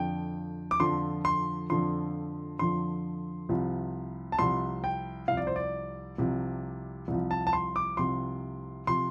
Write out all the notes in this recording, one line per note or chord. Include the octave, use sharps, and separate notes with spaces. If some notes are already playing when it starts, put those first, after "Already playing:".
Already playing: F2 D3 F3 G5
D6
F2 D3 F3 C6
C6
F2 D3 F3 C6
F2 D3 F3 C6
C2 C3 F3
A5
C2 C3 F3 C6
G5
C2 C3 F3 F5
D5
C5
D5
C2 C3 F3
C2 C3 F3
A5
A5
C6
D6
C2 C3 F3 C6
C3 F3 C6